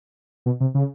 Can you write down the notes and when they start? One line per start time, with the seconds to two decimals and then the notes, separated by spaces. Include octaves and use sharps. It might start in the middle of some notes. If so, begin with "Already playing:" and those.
0.46 B2
0.61 C3
0.75 C#3